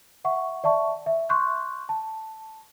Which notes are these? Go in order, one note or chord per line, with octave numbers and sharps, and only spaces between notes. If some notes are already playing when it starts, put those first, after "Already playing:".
E5 F#5 C#6
D5 E5 A5 C#6
E5
C6 C#6 F#6 G6
A5